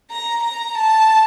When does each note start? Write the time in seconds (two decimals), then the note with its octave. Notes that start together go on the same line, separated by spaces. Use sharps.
0.10 A#5
0.43 A#5
0.77 A5